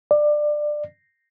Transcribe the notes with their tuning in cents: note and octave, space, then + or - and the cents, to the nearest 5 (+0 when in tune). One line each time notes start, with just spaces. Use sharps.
D5 +20